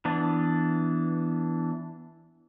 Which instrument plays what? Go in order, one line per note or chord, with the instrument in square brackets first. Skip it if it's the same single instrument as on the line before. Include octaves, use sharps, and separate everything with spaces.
[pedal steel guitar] E3 B3 D4